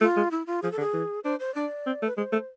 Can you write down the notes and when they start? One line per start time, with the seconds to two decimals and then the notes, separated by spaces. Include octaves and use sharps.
0.01 A3 F4
0.16 G#3
0.31 E4
0.47 F4
0.62 F3 G#4
0.72 A4
0.77 D3
0.80 G#4
0.93 E3
1.24 D4 C5
1.40 C5
1.55 D4 D5
1.86 C4
2.02 A3
2.07 B4
2.17 G#3 C5
2.32 A3